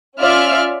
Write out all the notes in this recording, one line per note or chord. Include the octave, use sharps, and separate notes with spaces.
C#4 F4 D5 E5 F6